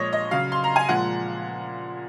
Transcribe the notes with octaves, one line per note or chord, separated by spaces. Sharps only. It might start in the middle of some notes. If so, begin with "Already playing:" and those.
Already playing: A#2 F3 G#3 C#5 D#5
D#5
C#3 F#3 F5
C6
A#5
G#5
A#2 F3 G#3 F#5